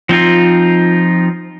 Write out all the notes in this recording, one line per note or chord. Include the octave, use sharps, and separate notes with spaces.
F3 C4 D#4 F4